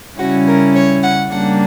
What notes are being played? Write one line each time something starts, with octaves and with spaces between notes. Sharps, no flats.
C#3 G3 C#4 E4 F#4
A#4
C#5
F#5
C#3 G3 A#3 D4 F#5